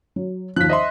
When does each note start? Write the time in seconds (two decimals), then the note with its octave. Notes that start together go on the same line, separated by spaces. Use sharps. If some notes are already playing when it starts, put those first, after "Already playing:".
0.16 F#3
0.56 D#2 F3 F#6 B6
0.69 C5 D#5 E5 C6